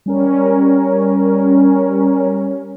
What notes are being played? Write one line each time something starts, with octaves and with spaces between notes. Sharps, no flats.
G3 C#4 A#4